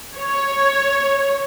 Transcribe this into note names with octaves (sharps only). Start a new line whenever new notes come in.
C#5